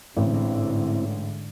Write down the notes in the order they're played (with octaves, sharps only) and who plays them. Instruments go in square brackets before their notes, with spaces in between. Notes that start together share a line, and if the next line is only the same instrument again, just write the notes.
[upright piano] A1 [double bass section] G#2 D3 [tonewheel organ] C4 E4